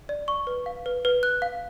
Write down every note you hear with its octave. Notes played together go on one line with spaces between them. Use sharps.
D5
C#6
B4
F5
B4
B4
F#6
F5